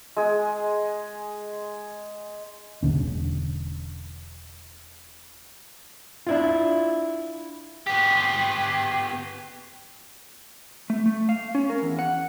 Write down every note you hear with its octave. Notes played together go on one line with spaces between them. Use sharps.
G#3 G#4
E1 D#2 D3 C#4
D4 E4 F4
B3 G4
A3
A3
F5
C#4
A#4
E2
F#5